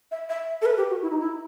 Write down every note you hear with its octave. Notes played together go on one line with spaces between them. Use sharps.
E5
E5
A4
B4
G4
F#4
E4
D#4
E4